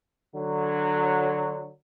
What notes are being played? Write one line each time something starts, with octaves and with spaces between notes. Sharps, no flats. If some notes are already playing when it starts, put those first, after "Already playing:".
D3 F#3